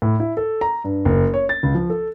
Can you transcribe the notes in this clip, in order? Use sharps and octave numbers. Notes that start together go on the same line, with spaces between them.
A2
E4
A4
A#5
G2
F#1
C#5
A6
C#2
F3
A4